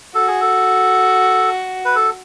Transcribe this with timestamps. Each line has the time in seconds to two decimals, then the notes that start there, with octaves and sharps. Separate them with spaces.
0.15 F#4 A4
0.27 G#4
0.41 A4
1.85 B4
1.96 A4